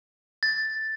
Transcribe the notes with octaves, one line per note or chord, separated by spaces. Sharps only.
A6